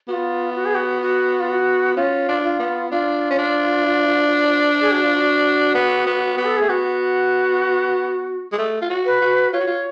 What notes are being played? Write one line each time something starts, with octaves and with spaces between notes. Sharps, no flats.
B3 F4 F#4
F#4
G#4
F#4
F#4
F4
F#4
C#4 F4
D4
F4
B3
D4 F4
C#4
D4
G#4
F#4
F4
F#4
B3
B3
B3
A4
A3 G#4
B3 F#4
G#3
A3
F4
F#4
B4
F#4
F4 C#5
F#4
F4